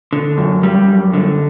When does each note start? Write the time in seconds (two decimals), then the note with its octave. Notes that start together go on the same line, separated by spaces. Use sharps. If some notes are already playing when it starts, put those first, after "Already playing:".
0.13 D3
0.38 F#2
0.63 G3
0.88 F#2
1.13 D3